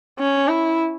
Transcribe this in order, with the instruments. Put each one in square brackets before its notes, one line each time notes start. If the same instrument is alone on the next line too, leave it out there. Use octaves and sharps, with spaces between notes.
[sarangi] C#4
E4